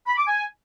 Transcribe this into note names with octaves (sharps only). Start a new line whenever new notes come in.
B5
D6
G#5